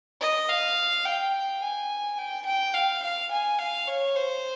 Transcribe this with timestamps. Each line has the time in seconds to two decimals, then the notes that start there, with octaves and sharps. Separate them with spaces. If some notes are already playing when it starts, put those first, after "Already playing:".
0.21 D#5
0.49 F5
1.05 G5
1.61 G#5
2.18 G5
2.46 G5
2.74 F5
3.02 F5
3.31 G#5
3.59 F5
3.87 C#5
4.16 C5